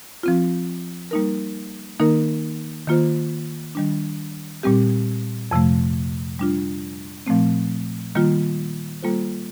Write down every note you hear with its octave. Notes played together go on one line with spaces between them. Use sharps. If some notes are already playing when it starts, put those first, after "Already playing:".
F3 C4 F4
G3 A#3 D#4 A#4
D#3 A#3 D#4 A#4
D#3 A#3 F4 C5
D#3 G3 D4
A#2 G3 C4 G4
F2 C3 F3 A3
G3 D4 F4
A#2 F3 A3 C4
D#3 G3 A#3 F4
G3 A#3 F4 A4 C5